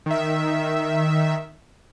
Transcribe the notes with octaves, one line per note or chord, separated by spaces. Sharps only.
D#3 E5